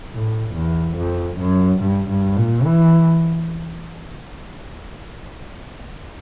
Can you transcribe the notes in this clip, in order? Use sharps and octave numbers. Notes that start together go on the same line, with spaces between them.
A2
E2
F2
F#2
G2
G2
A#2
E3